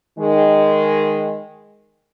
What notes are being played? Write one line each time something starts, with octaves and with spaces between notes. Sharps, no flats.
D#3 G#3